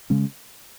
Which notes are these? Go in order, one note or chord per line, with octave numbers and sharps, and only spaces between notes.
C#3 G#3 C#4